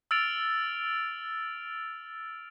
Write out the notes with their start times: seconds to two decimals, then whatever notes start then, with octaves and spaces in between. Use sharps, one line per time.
0.11 E6 F6 A6 D7 F7